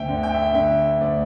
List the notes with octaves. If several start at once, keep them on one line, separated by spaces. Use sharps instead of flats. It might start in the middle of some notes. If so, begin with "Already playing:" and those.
Already playing: D2 E5 G5
D3
G5
E5
G5
D3 E5
D2 D5